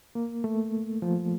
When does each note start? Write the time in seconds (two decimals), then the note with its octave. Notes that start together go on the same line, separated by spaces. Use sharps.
0.15 A#3
0.44 A3
1.02 F3